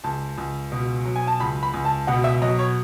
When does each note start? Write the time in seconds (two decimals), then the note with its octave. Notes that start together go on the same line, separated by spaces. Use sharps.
0.04 C#2 A5
0.38 C#2
0.72 B2
1.05 F#3
1.16 G#5
1.27 A5
1.40 C#2 B5
1.63 B5
1.74 C#2
1.85 A5
2.07 B2 F#5
2.24 E5
2.42 F#3 D#5
2.59 C#5